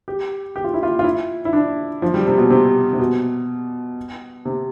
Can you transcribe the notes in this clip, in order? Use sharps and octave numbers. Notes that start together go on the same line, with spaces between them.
G4
G4
F4
E4
F4
F4
E4
E4
D4
F3
G3
C3
B2
C3
C3
B2
C3